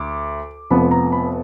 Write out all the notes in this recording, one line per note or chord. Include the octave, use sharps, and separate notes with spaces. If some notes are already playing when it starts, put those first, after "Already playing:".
Already playing: D2 D6
F1 F2 F3 B3 B5
A#5
B5